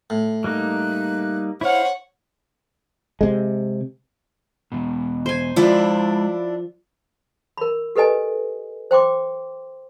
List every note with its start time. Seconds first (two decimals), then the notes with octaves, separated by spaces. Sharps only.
0.10 A2
0.44 G3 A#3 D#4 F#6
1.61 E4 C5 C#5 F5 F#5
3.21 C3 G#3
4.72 E2 B2
5.26 C5 G#5
5.56 F3 G#3 D4 E4 B4
7.57 A#4 B5
7.96 G4 A4 B4 D#5 G#5
8.91 C5 G5 C6 D6